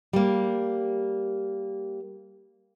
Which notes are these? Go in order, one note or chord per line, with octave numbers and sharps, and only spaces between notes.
G3 A#3